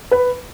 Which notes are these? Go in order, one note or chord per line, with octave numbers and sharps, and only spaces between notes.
B4